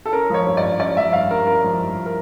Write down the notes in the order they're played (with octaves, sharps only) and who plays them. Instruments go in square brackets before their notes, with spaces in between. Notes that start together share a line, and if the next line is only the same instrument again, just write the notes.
[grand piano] A4
C#4 A#4
F3 C#5
G2
D5
G2
C#4 D5
F3 E5
G2 F5
G2 A#4
C#4 A#4
F3
G2
A#4